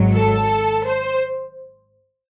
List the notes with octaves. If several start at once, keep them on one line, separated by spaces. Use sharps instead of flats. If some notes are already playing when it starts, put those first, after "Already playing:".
Already playing: G#1 G#2 F#3
A4
C5